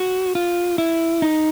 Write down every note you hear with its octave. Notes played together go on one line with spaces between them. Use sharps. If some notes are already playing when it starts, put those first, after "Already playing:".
Already playing: F#4
F4
E4
D#4